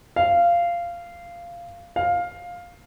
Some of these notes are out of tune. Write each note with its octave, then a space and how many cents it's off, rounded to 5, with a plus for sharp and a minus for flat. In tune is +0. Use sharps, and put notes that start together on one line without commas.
F5 -15
F5 +10